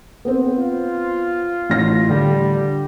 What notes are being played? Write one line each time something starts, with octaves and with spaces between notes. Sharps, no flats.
B3 C4
F4
A1 A#6
D3 G3